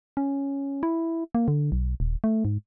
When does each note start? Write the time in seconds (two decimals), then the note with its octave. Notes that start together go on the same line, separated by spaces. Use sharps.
0.17 C#4
0.83 E4
1.35 A#3
1.48 D3
1.72 B1
2.00 D#1
2.24 A3
2.45 G#2